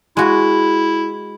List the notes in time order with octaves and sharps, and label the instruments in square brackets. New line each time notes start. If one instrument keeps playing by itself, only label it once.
[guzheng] G#3 F#4 [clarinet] E4